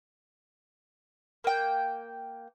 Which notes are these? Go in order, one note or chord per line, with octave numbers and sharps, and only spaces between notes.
A#3 G5